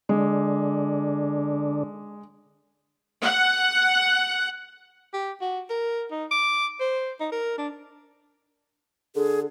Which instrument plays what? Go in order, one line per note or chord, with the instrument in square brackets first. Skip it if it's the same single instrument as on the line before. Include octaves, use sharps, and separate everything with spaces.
[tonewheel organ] D3 D4 [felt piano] G#3
[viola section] F#5
[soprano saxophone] G4
F#4
A#4
D#4
D6
C5
D#4
A#4
D4
[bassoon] D3 [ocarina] G#4